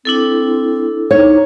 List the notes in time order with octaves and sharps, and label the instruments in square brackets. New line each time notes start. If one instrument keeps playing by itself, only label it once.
[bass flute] C4 [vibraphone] D4 E4 A4
[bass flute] D#4 [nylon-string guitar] C#5